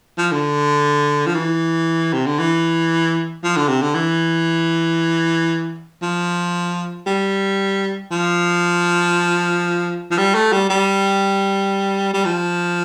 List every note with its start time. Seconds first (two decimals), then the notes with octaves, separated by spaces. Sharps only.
0.18 F3
0.31 D3
1.26 F3
1.35 E3
2.13 C3
2.26 D3
2.39 E3
3.43 F3
3.56 D3
3.69 C3
3.82 D3
3.95 E3
6.02 F3
7.06 G3
8.11 F3
10.11 F3
10.18 G3
10.34 A3
10.52 G3
10.70 G3
12.13 G3
12.25 F3